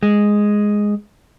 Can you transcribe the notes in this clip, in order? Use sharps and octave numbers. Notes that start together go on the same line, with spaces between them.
G#3